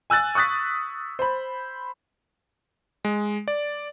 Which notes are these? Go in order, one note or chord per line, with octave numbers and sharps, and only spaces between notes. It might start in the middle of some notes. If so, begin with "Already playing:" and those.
G#5 E6 F#6 A6
C#6 D#6 F#6 A6 B6
C5 B5
G#3
D5